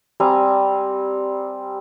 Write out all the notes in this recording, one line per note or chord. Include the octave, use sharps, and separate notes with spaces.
G3 C4 G#5 A#5